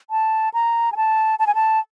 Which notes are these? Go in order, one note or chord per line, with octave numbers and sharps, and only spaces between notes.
A5
A#5
G#5
A5
A5
G#5
A5